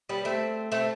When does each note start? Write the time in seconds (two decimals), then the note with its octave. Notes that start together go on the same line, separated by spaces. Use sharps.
0.09 G3 B3
0.25 A3 C4
0.72 A3 C4